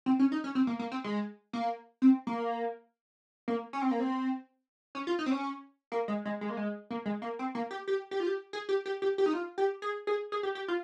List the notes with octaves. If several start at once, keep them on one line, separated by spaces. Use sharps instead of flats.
C4
C#4
D#4
C#4
C4
A#3
A#3
C4
G#3
A#3
C4
A#3
A#3
C#4
C4
A#3
C4
C#4
F4
D#4
C4
C#4
A#3
G#3
G#3
G#3
A#3
G#3
A#3
G#3
A#3
C4
A#3
G4
G4
G4
F4
G4
G#4
G4
G4
G4
G4
D#4
F4
G4
G#4
G#4
G#4
G4
G4
F4